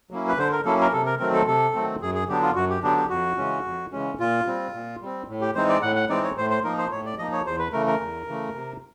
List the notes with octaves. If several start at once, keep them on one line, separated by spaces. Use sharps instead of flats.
F#3 A#3 C#4 E4
B4
D3 C5
A#4
F#3 A#3 C#4 E4 A4
A#4
C3 A4
A#4
D#3 F#3 A3 C4 A#4
A4
C3 A4
D#3 F#3 A3 C4
F#2 G#4
G#4
D3 F#3 B3 D4 G4
F4
F#2 F#4
G4
D3 F#3 B3 D4 G4
G4
F2 F#4
C#3 E3 G#3 C#4
F2
C#3 E3 G#3 C#4
A#2 F4
G3 C4
A#2
G3 C4
A2
G4
E3 G#3 C4 D#4 C5
D5
A2 F#5
F#5
E3 G#3 C4 D#4 D5
C#5
A2 C5
C5
F3 A#3 D#4 A#4
C5
A2 C#5
D5
F3 A#3 D#4 D#5
C#5
E2 C5
B4
C#3 E3 A3 A#4
A#4
E2
C#3 E3 A3
C3